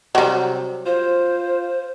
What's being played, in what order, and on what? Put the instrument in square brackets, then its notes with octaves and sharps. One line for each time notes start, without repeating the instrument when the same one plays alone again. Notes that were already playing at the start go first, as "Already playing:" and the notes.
[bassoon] C3 [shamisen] F#3 G3
[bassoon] F4 [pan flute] C5